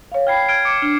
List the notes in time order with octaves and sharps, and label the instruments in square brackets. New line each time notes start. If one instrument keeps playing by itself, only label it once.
[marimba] C#5 F5
[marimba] G5 B5 [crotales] F6 G#6 C7
[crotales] F6 G#6 D7
D6 C#7 D7
[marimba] D4 [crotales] F6